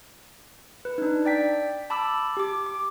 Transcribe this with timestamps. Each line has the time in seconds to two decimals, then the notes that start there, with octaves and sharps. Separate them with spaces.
0.85 B4
0.98 D4 D#4
1.25 D5 G5 B6
1.90 A5 B5 D6 E6
2.37 G4 D6
2.66 D6